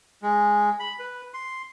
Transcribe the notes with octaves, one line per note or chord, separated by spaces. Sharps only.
G#3
B5
B4
C6